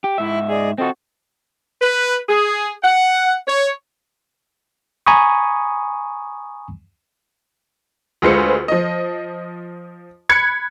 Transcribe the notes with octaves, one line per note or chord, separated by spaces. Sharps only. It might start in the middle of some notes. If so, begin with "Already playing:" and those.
G4
G#2 E4 E5
G#4 D5 D#5
C4 F4 F#4 A4 D#5
B4
G#4
F#5
C#5
G#5 A#5 B5 C#6 D#6
D2 G#3 F4 B4 C5 C#7
F3 D#5
B5 F#6 G#6 C#7